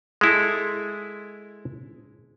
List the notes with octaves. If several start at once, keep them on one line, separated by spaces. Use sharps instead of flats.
G#3 E4 A4